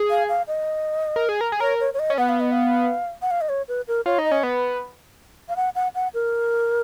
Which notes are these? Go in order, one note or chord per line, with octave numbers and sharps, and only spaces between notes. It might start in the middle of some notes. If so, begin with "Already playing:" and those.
Already playing: G#4
F5
F5
D#5
A#4
G#4
A#4
G#4
A#4 C#5
C#5
C#5
D#5
C#4
B3 F#5
F5
D#5
F5
F#5
F5
D#5
C#5
B4
A#4
F4 C#5
D#4
D#5
C#4
B3
F5
F#5
F#5
F#5
A#4